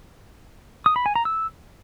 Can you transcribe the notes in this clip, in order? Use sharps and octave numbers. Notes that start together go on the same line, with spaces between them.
D#6
B5
G#5
A#5
E6